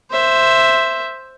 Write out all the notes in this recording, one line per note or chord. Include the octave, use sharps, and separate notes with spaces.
C5 E5